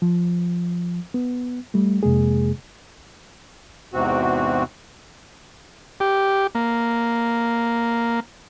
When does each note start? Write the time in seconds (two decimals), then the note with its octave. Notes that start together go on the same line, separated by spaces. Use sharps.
0.02 F3
1.14 B3
1.74 G3 A3
2.03 F2 C3 G#3 A#3 G#4
3.93 E2 G#2 C3 C4 F#4
6.00 G4
6.55 A#3